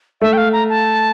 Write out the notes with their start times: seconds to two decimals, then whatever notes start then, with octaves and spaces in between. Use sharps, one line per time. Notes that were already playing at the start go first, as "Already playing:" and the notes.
0.21 A3 E5
0.33 G5
0.38 F5
0.53 A#5
0.70 A5